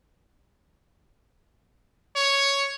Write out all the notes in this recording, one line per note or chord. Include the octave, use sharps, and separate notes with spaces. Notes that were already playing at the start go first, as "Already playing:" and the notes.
C#5